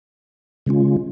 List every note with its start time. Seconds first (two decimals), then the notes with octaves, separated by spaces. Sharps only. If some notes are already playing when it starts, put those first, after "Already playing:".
0.66 C#3 G#3 C#4 F4